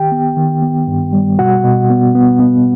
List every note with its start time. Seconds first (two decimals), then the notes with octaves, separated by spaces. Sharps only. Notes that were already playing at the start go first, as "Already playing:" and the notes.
Already playing: D#3 G4 G5
0.12 B3
0.37 D#3
0.62 B3
0.87 G2
1.13 G3
1.39 B2 F#4 F#5
1.64 B2
1.90 B3
2.15 B3
2.40 B3